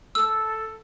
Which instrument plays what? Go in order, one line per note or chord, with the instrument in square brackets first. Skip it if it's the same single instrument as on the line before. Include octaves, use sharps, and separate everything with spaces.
[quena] A4 [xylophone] E6